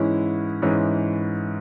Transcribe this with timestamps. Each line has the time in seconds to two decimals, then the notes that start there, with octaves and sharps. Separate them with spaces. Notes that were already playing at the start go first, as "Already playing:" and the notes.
Already playing: G#2 E3 G#3 C#4 E4
0.62 G#2 E3 G#3 C#4 E4